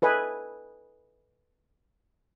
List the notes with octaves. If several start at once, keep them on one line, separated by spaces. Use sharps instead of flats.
A4 B4 D#5 G#5